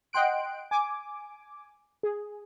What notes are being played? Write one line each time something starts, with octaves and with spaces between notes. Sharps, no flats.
D#5 F#5 G5 C6 F#6 D7
G#5 D6
G#4